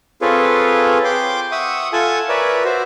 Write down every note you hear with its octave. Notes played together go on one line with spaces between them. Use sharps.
C4 F4 G#4 A4 B4 C#5
G5 C6 D6
E5 F#5 C#6 D#6
F4 A4 F#5 G#5 A5
A#4 B4 C#5 D5 E5
F#4 C5 E5